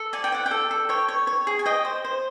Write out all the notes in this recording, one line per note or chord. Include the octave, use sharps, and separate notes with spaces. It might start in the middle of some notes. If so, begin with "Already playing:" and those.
Already playing: A4
D5 G#5
G5
D5 F#5
G5
A4
A4
C#5 G5
C#5
C#5
G#4
G#5
D#5 G5
C5
C5